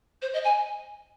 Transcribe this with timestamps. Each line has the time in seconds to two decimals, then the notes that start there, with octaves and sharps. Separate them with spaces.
0.22 C5
0.33 D#5
0.44 G#5